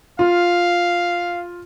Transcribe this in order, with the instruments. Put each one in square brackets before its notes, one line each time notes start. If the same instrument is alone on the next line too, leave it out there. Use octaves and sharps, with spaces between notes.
[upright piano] F4 [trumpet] F5